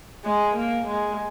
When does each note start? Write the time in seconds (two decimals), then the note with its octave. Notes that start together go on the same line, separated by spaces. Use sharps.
0.24 G#3
0.56 A#3
0.88 G#3